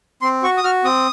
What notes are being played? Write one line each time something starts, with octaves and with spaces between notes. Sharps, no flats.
C4 C6
F#4 C#6
D#6
F#4 F6
C4 D#6